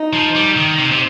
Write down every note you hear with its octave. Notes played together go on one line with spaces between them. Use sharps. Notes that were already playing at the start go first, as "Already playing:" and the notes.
Already playing: D#4
F3
G3
D#3
C3
C3